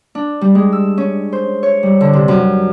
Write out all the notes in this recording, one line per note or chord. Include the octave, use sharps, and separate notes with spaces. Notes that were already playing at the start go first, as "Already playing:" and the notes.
D4
G3
G#3
E6
C#4
C5
C#5
G3
D3
C3
F#2